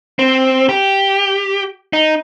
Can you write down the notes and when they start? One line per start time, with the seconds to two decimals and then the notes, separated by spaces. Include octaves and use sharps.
0.19 C4
0.69 G4
1.93 D#4